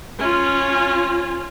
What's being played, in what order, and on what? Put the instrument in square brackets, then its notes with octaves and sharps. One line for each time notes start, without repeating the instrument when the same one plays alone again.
[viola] C#4 F4